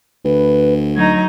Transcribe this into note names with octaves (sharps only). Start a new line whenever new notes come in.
D2 B4
F#3 D#4 G#6